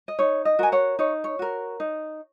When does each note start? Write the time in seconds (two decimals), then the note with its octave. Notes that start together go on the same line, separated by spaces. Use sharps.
0.08 D#5
0.19 D#4 C#5
0.45 D#5
0.59 F#4 A#4 G#5
0.72 C#5 F#5
0.99 D#4 C#5
1.24 C#5
1.39 F#4 A#4
1.80 D#4